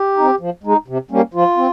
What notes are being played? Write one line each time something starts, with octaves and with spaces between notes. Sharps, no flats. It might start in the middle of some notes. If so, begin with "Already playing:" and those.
Already playing: G4
C4 D#4
F3
G#3 D#4
C3
G3 A#3 C#4
F3 F4
C4